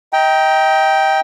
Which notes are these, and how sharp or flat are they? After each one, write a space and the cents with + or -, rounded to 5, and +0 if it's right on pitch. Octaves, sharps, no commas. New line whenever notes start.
D#5 +35 G5 +0 A#5 +0